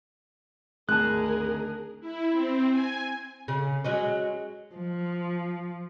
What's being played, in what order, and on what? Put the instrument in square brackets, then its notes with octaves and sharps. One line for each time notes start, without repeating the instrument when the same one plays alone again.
[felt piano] G#1 A5 [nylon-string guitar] D2 [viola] G#4 A#4 [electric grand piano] F#6
[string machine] E4
C4
G#5
[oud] C#3
F#3 G#3 C#4
[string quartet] F3